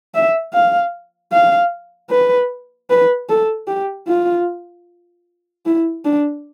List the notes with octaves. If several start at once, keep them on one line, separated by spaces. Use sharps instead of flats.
E5
F5
F5
B4
B4
A4
G4
F4
E4
D4